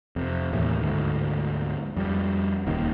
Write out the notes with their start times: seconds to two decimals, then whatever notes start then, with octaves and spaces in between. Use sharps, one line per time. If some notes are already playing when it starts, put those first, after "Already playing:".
0.16 F2 C3
0.52 D#2 A2 E3
0.80 D2 G#2
1.96 F2 G3
2.66 D#1 C#2 D#3 A#3